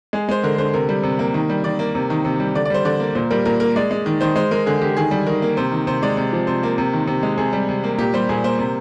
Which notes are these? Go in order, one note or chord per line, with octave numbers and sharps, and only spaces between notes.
G#3 G#4
G#3 C5
D3 A#4
D3 C5
C3 A#4
G3
C3
A#3
D#3
G3
D#3 D5
A#3
C3
D#3
C3
G3
D3 D5
D5
G3 C5
D3 D5
A#3
A#2 C5
G3 A#4
A#2 A#4
A#3 A#4
G#3 D5
G#3
D#3
D#3 C5
G#3 C5
G#3 A#4
D3 G#4
D3 G4
D#3 G#4
G3
D#3 A#4
A#3
C3 C5
D#3
C3 C5
G#3 D5
C3
F3
C3 C5
A#3
C3
D#3
C3
G#3
C3 G#4
G3
C3
A#3
A#2 G4
G3 C5
A#2 G#4
A#3 C5
C3